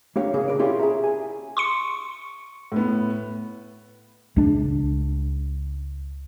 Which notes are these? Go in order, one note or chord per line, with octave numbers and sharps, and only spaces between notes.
A#3 D4 G4 C#5 F5
C#3 A#3 C#4 G#4
A#4 B4 D5
C#4 E4 F4 G4 G#4
G#4 E5 A#5
G#5
C6 C#6 C#7
A2 B3
C#2 D4